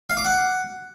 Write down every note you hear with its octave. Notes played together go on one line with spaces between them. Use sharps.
F5
D6
F#5